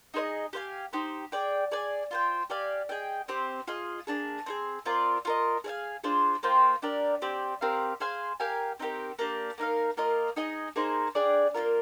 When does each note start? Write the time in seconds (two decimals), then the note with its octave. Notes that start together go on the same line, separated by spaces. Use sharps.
0.14 D#4 G#4 C5 D#5
0.53 G4 C5 F5 G#5
0.93 D#4 G4 C5
1.32 G#4 D5 G5
1.71 G#4 D5 G#5
2.11 F4 C5 G5
2.50 G4 D5 F5 G#5
2.89 G#4 D#5 G5
3.28 C4 G4 C5
3.67 F4 G#4 D#5
4.07 A#3 D4 G#4
4.46 C4 D#4 G#4
4.86 C4 F4 A#4 D5
5.25 F4 A#4 D#5
5.64 G#4 D5 F5 G#5
6.04 D4 F4 G#4 C5
6.43 A#3 F4 C5 G5
6.82 D4 G4 A#4 D5
7.22 C4 G4 D5
7.61 C4 G4 A#4 F5
8.00 G#4 C5 F5 G#5
8.40 G4 A#4 F5 G#5
8.79 C4 D#4 G4 A#4
9.19 A#3 D4 G4
9.58 A#3 D#4 A#4 F5
9.97 A#3 F4 A#4 D#5
10.36 D#4 G#4 D#5 G#5
10.76 A#3 D#4 G#4 C5
11.15 D4 G#4 D5 G5
11.54 A#3 D4 F4 A#4